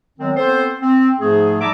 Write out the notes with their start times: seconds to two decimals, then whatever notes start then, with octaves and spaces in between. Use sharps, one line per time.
0.18 D#3 F#3 G#3 B3 C4
0.36 B3 C4 A4 C5
0.80 C4
1.19 G#2 F3 A3 G#4
1.60 G3 D#4 E5 A5 A#5 D6